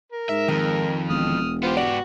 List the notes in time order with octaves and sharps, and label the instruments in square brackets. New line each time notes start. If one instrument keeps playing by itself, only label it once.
[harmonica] A#4
[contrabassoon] G#2 [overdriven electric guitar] E5
[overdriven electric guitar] F2 [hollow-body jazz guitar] D#3
[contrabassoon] E1 [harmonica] D#6 F6
[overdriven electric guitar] B3 G4 [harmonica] F4 C5
[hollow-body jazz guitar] G#2 D5 [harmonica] F#4 F#5